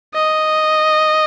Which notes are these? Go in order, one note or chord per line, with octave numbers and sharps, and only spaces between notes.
D#5